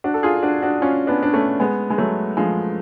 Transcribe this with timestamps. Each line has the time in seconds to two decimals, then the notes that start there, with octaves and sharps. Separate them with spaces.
0.04 D4 F#4
0.14 A4
0.23 F4 G#4
0.43 D4 F#4
0.62 D4 F#4
0.81 C#4 F4
1.07 B3 D4
1.23 D4
1.33 A3 C#4
1.60 G#3 B3
1.90 G#3
1.98 F#3 A3
2.37 F3 G#3